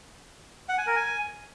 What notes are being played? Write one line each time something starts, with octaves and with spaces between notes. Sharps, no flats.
F#5
G#5
A#4
G#5